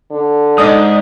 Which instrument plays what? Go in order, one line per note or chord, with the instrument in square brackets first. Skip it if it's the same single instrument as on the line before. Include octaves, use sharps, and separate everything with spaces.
[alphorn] D3
[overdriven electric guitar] G#2 [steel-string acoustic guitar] G#4 D5 D#5 [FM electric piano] D#6